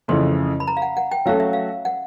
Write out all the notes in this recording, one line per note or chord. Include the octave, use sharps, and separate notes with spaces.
F2 C#3 E3 A3 C6
B5
A#5
F5
F#5
F#5
G5
F#3 A3 C#4 F#4 A4 F5
E5
F5
F#5